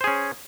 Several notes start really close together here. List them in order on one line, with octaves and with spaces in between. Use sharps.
C5 G#4 C#4